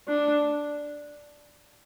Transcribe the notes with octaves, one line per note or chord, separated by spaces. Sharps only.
D4